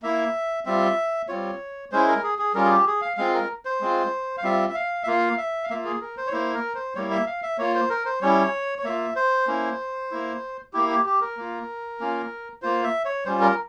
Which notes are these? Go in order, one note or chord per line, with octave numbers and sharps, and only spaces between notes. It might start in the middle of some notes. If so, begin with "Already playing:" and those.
A#3 E4 E5
G3 C4 F4 E5
G3 C4 F4 C#5
G#3 C#4 E4 C5
A#4
G#4
G#4
G3 C#4 F4 A#4
G#4
G4
G#4
F5
G#3 C4 F4 F5
A#4
C5
G#3 C4 F4
F5
G3 C4 F4 E5
E5
F5
E5
A#3 F4 F5
E5
F5
A#3 F4 E5
G#4
A#4
C5
C#5
A#3 E4 C5
A#4
C5
G3 A#3 E4 C#5
E5
F5
E5
A#3 F4 C#5
C5
A#4
C5
G3 C#4 E4 C#5
C#5
A#3 F4 E5
C5
A#3 C#4 E4
A#3 E4
A#3 E4 G4
G4
G4
A#4
A#3 F4
A#3 C#4 F4
A#3 F4 C5
E5
C#5
G3 C#4 F4 C5
A#4